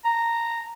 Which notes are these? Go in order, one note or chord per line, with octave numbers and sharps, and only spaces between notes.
A#5